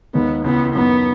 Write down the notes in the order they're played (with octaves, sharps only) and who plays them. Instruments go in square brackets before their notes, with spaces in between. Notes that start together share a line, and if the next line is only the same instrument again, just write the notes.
[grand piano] D#2 D#3 G#3 [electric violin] B3
[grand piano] C#2 C#3 E3 [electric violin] B3
[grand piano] F#2 D#3 F#3 [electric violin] B3